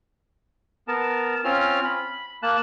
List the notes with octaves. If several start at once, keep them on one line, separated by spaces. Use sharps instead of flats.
B3 A#4 A5
C4 C#4 F4 F6
B5
A#3 A5 F#6